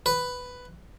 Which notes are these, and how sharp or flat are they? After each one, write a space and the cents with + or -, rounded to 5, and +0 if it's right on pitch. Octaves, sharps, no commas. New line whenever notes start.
B4 +5